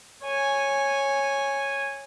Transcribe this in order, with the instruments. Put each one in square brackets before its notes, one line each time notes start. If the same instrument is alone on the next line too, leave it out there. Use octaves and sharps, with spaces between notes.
[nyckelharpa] C#5 G#5